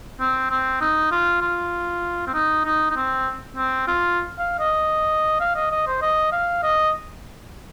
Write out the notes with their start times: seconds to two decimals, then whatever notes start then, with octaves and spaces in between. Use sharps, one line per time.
0.20 C4
0.51 C4
0.81 D#4
1.12 F4
1.42 F4
2.27 C4
2.34 D#4
2.65 D#4
2.91 D#4
2.96 C4
3.57 C4
3.88 F4
4.39 F5
4.60 D#5
5.41 F5
5.56 D#5
5.72 D#5
5.87 C5
6.02 D#5
6.33 F5
6.63 D#5